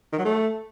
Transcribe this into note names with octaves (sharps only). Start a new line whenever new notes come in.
D#3
F#3
A3